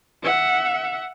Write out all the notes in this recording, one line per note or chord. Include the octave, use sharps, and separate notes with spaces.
E5 F#5